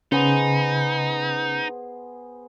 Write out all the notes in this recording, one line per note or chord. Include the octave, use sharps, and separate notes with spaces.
C#3 B3 D#4 G#4 C5